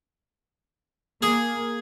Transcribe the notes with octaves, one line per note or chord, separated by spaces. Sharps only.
A#3 G#4